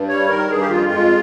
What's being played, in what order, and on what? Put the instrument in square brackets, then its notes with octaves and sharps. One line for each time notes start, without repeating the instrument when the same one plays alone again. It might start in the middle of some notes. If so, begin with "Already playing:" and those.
Already playing: [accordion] G2
G3 C#5
D#3 A#4
G2 G#4
G4
F2 F4
G#3